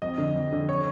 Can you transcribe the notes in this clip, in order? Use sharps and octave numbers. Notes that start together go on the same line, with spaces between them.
F2 D#5
D3
F2
D3
C#5